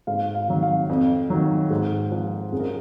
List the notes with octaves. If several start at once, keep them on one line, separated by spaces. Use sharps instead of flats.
G#2 F5
F5
D#3 F#3
F5
F2
D#3 F#3
G#2
F3
F#2 G#4
A#4